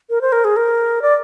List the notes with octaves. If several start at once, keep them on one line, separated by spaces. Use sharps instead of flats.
A#4
C5
A#4
G#4
A#4
D5